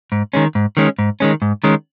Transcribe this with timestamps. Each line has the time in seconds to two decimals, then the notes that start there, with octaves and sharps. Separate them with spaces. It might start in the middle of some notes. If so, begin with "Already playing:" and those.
0.12 G#2
0.33 D#3 G#3 C#4
0.55 G#2
0.77 D#3 G#3 C#4
0.99 G#2
1.20 D#3 G#3 C#4
1.42 G#2
1.64 D#3 G#3 C#4